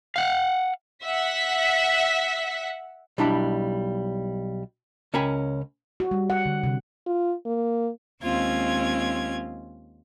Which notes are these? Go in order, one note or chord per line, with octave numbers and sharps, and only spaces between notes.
F5 F#5
E5 F#5 B6
B1 G3 D4 E4 B5
C#2 C#4 A#4 G5 G#5 B5
F#4
G3
F#5
D3
C3
F4
A#3
D#2 G#3 C4 C#4 F4 G#6